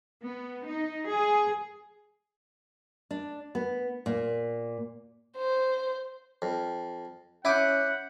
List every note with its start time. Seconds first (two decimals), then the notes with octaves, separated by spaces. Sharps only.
0.24 B3
0.67 D#4
1.09 G#4
3.11 D4
3.55 B3
4.06 A#2
5.37 C5
6.42 F2
7.45 C#4 E4 E5 F#5 D6 D#6 G6